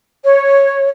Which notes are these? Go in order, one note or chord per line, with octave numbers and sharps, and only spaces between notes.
C#5